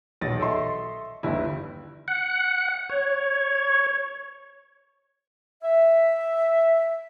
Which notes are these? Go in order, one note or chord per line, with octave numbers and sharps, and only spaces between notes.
D#1 B1 E2 A6 A#6
A4 D#5 E5 C6 C#6
G1 D#2 G3 E4
F#5
C#5
E5